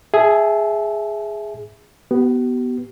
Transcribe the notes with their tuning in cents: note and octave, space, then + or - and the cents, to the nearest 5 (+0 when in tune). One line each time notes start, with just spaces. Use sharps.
G#4 +0 E5 -5 A5 -30
B3 +0 G4 -45